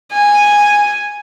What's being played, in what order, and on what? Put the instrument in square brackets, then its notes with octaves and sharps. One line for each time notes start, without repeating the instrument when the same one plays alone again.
[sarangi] G#5